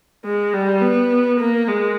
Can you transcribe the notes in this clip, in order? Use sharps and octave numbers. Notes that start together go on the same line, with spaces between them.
G#3
G3
B3
A#3
G#3